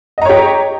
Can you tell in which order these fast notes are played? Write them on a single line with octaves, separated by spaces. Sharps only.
D#5 A#5 C#5 G4